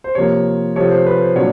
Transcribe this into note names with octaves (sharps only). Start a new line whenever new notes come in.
C5
C3 F3 A#3 C#5
C3 F3 A3 C#5
C5
B4
C5
A#2 F#3 B3 D4 C#5